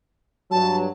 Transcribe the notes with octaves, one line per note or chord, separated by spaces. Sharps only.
G2 F#3 A5